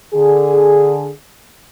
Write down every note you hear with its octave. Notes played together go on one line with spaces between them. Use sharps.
D3 G#4